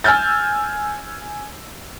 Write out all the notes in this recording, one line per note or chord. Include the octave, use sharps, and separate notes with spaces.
G#5 E6 F6 G6 A6